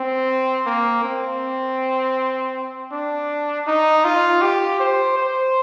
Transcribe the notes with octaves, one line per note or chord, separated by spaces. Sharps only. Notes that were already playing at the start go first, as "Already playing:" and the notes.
Already playing: C4
A#3
C4
D4
D#4
F4
G4
C5
C5